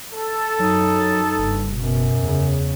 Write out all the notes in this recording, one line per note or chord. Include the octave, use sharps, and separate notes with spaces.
A4
F#2 F#3 D#4
F#1 G2
F#2 B2
E2 C#3